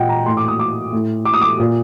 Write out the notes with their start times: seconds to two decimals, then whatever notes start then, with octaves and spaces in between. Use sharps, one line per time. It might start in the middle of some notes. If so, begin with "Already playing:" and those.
Already playing: A#2 D#5 F#5 G5
0.09 A#5
0.26 A2 C6
0.37 D6
0.48 D#6
0.59 D6
0.92 A2
1.25 D6
1.34 D#6
1.41 D6
1.59 A#2